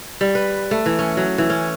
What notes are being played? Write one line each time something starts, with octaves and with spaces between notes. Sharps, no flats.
G3
B4
A3
E3
C#4
F#3
E3
C#4